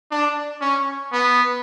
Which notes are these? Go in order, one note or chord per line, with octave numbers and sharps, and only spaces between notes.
D4
C#4
B3